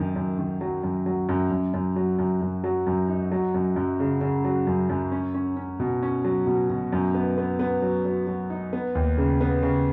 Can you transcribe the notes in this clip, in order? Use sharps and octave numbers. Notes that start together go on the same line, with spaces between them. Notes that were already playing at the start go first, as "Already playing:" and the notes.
Already playing: F#2 D#3
F#2
D#3
F#3
F#2
F#3
F#2
F#2
F#2
F#3
F#2
F#2
F#3
F#2
D#4
F#3
F#2
F#2
C#3
C#3
F#3
F#2
F#2
C#4
C#4
C#4
B2
C#4
F#3
B2
B2
F#2
B3
B3
B3
F#3
F#3
F#3
D#4
B3
D#2
C#3
B3
C#3